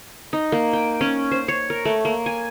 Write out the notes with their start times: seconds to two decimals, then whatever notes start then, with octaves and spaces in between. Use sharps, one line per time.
0.33 D#4
0.52 A#3
0.73 G5
1.01 C#4
1.31 C5
1.48 C#5
1.70 A#4
1.85 A3
2.05 A#3
2.26 G#5